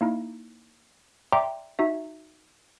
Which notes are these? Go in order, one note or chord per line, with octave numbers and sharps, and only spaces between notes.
A#3 D#4 E4
D5 E5 G5 A#5 C6 D6
D#4 F#4 E5